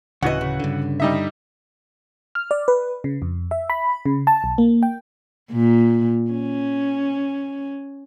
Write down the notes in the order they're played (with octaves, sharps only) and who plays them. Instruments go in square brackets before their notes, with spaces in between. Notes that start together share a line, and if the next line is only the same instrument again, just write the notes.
[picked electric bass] D1 [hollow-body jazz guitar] C#3 D#5 [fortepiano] E3 F#4 F#5
[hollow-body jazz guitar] C#3
[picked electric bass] G2 D3
[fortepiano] G3 D#4 E5
[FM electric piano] F6
D5
B4
C#3
F2
E5
B5
C#3
A5
B1
A#3
G5
[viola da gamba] A#2
C#4